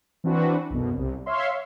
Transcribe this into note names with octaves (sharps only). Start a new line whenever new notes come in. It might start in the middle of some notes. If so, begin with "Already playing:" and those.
E3 C4 D4 F#4 B4
B1 F#2 B2
C2
C#5 E5 F5 C6